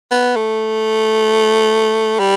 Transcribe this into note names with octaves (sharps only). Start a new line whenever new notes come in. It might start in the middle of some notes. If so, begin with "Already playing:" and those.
B3
A3
G3